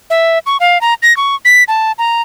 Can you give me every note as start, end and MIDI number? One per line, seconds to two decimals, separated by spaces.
0.10 0.39 76
0.46 0.57 85
0.60 0.81 77
0.81 0.94 82
1.03 1.16 94
1.17 1.35 85
1.45 1.64 95
1.68 1.92 81
1.98 2.22 82